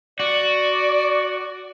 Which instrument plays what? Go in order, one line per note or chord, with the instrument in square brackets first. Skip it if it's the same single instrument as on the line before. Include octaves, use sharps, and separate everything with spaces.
[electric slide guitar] F#4 [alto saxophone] D5